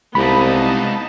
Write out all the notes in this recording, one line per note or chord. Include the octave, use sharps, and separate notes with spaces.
C2 G#3 B3 D#4 F5 A5 B5